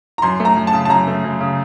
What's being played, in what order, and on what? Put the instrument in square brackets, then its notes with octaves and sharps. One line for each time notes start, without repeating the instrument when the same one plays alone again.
[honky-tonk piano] A#5
[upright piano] F#2 [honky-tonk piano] C6
[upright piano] A3
[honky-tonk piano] A#5
[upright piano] F#2
[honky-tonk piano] A5
[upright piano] C#3
[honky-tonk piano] A5
[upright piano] F#2 [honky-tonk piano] A#5
[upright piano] A3
F#2
C#3